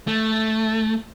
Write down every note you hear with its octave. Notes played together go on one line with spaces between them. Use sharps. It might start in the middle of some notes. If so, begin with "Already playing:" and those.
A3